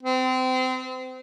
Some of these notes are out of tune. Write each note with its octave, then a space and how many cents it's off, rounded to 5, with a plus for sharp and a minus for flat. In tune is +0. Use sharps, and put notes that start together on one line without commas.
C4 -30